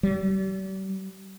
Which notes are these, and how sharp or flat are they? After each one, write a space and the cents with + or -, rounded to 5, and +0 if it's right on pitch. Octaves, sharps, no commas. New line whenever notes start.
G3 -40